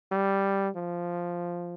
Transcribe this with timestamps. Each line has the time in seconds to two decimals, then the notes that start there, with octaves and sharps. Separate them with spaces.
0.12 G3
0.76 F3